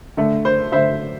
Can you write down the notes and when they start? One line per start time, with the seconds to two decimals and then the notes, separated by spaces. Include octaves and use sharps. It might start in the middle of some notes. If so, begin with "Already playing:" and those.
0.17 D3 A3
0.45 C5
0.72 D3 A3 C5 E5